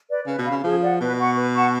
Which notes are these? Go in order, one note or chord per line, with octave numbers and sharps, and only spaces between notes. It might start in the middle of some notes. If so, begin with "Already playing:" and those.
B4 D5
C#3 B4
B2
F5 B5
C#3
F3 G#4
D5 F#5
B2 B4
F#5 C#6
B4
F#5 A5 C#6